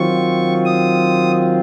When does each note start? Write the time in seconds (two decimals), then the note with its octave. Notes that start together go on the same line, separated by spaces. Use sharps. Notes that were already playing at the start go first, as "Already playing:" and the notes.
Already playing: D#3 F#3 C4 F4 C#6
0.65 D#6